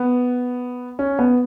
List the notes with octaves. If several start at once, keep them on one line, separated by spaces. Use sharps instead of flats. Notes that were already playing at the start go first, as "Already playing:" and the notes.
Already playing: B3
C#4
B3